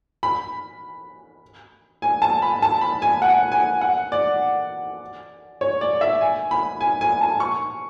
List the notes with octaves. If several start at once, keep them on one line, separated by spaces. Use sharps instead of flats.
B5
G#5
A5
B5
A5
B5
G#5
F#5
G#5
F#5
D5
C#5
D5
E5
G#5
B5
G#5
G#5
A5
C#6